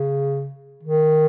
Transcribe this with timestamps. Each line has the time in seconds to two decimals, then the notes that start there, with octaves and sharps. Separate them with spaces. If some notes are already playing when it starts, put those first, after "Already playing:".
Already playing: C#3
0.83 D#3